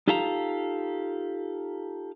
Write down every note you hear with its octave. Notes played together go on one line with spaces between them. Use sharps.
D#4 F4 G4 A4 F5 A#5